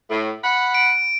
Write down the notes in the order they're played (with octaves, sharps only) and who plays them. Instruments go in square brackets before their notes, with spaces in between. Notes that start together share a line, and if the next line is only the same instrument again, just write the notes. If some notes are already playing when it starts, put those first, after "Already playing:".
[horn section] A2
F#5 B5
[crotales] D7